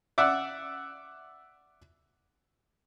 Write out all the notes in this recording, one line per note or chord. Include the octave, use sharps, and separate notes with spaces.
D5 E5 F#5